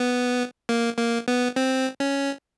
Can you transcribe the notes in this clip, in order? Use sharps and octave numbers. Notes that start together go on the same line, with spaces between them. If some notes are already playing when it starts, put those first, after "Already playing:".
Already playing: B3
A#3
A#3
B3
C4
C#4